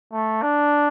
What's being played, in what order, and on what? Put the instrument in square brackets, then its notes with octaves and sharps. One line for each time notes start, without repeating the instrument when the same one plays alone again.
[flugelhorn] A3
D4